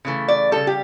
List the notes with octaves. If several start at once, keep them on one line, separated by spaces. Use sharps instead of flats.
C#3 E3 A3
D5
C#3 G3 A4
G4